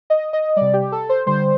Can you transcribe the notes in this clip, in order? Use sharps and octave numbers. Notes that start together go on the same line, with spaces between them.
D#5
D#5
C3 G3 D5
G4
A4
C5
D3 G3 C5